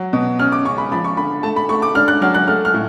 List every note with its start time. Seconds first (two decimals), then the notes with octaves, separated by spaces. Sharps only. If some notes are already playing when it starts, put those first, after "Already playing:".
Already playing: F#3
0.13 B2
0.39 C#4 F6
0.52 D6
0.65 C#3 C#6
0.78 B5
0.92 F3 B5
1.04 C#6
1.17 D3 B5
1.43 A3 A5
1.56 B5
1.69 A3 C#6
1.82 D6
1.95 D4 F6
2.08 F#6
2.21 F#3 F6
2.34 F#6
2.47 A3 F6
2.65 F6
2.74 A2